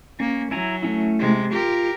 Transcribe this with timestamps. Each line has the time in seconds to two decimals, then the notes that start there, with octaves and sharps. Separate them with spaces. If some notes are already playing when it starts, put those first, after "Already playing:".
0.20 A#3 C#4
0.51 F#3 E4 G#5 A#5
0.83 A3 C#4 E4
1.19 C3 G#3
1.52 F4 G4 A#4